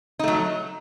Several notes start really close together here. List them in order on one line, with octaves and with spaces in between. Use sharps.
D#4 A3 F#3